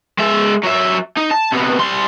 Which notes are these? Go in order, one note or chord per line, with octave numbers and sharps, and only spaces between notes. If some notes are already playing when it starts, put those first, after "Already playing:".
G#3 E5
F#3 E5
D#4
A5
C3 B3
G3 C6